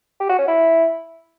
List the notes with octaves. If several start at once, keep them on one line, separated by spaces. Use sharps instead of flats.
G4
F#4
C#4
E4